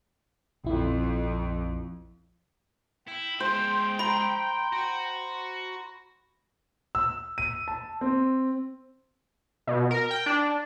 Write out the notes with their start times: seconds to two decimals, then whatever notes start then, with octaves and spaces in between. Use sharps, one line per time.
0.65 A#1 F2 E4
3.08 E4 G5
3.40 G#3 C5 E5
3.99 A#5 B5
4.73 F#4
6.95 E6
7.38 D#7
7.68 A5
8.01 C4
9.67 B2
9.91 A#4
10.11 G5
10.26 D4